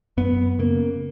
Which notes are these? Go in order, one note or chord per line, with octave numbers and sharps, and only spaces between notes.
F#2 B3
C#3 A#3